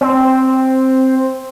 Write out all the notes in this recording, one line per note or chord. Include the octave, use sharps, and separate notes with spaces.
C4